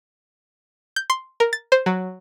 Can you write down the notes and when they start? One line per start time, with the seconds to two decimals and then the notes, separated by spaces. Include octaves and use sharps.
0.96 G6
1.10 C6
1.40 A#4
1.53 A6
1.72 C5
1.86 F#3